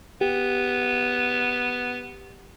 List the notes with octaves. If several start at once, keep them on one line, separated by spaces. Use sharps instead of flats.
B3 G4